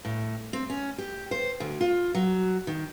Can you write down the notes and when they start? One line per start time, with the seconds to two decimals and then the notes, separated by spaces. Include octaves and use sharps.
0.05 A2
0.53 C4
0.70 C#4
0.98 G4
1.31 C5
1.60 D2
1.81 F4
2.15 F#3
2.67 D#3